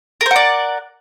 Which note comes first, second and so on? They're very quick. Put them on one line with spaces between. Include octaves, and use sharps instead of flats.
A#4 C5 F#5 D5